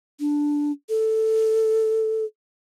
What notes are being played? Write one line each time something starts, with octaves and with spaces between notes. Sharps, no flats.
D4
A4